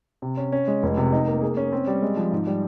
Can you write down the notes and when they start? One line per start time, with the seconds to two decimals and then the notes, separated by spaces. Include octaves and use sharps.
0.22 C3
0.37 C#4
0.52 C#4
0.68 G#3
0.83 F1
0.97 C3
1.12 D#4
1.28 A#3
1.42 G#4
1.57 C#4
1.73 C4
1.87 G3
2.02 G#3
2.17 F3
2.32 G#2
2.47 G3